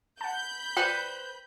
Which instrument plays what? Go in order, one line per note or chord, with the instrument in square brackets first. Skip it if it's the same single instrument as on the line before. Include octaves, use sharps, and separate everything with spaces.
[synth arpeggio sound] F#5 A5 [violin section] B5 G6
[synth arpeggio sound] F4 D5 D#7 [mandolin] B4 C5 [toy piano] G5